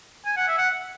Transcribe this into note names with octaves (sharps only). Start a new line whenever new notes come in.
G#5
F#5
E5
F#5